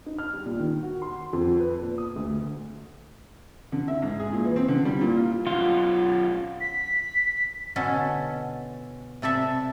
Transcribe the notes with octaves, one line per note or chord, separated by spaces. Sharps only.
D#4
F6
G3
A#2
D#3
F#4
C6
F2
B4
A#2
D#6
D2
D3
E5
G#2
G#4
A#2
E3
C4
D3
G3
A#2
F4
F#2 B2 F4
B6
B2 D3 C#4 A4
C3 A4 D5 E5